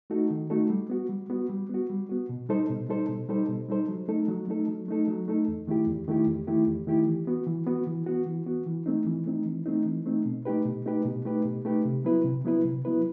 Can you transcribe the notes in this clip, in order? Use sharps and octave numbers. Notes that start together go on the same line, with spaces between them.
A3 D#4 F#4 A4
D#3
A3 D#4 F#4 A4
G3
B3 F#4
G3
B3 F#4
G3
B3 F#4
G3
B3 F#4
B2
G3 D#4 A4 C5
B2
G3 D#4 A4 C5
B2
G3 D#4 A4 C5
B2
G3 D#4 A4 C5
F#3
A3 D#4 A4
F#3
A3 D#4 A4
F#3
A3 D#4 A4
F#3
A3 D#4 A4
E2
D#3 A3 E4 G4
E2
D#3 A3 E4 G4
E2
D#3 A3 E4 G4
E2
D#3 A3 E4 G4
E3
B3 F#4
E3
B3 F#4
E3
B3 F#4
E3
B3 F#4
E3
A3 C4 D#4
E3
A3 C4 D#4
E3
A3 C4 D#4
E3
A3 C4 D#4
B2
A3 D#4 G4 B4
B2
A3 D#4 G4 B4
B2
A3 D#4 G4 B4
B2
A3 D#4 G4 B4
C3
F#3 B3 E4 B4
C3
F#3 B3 E4 B4
C3
F#3 B3 E4 B4